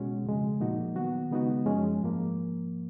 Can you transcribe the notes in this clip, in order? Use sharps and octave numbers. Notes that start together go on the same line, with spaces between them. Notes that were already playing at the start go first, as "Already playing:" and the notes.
Already playing: B2 G#3 C#4 F#4
F2 C#3 G#3
A#2 F3 A#3 D#4 F#4
D#3 F#3 B3 F#4
C#3 G#3 B3 D#4 F#4
F#2 F3 G#3 C#4
G#2 F3 A#3